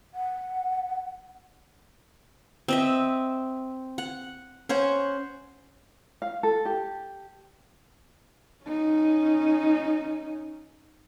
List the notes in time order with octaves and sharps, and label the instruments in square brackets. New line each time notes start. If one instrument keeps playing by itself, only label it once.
[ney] F#5
[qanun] C4 D#5 E5
F#5
C#4 C5 F#5
[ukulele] F5
A4
G4
[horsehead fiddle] C#4 D#4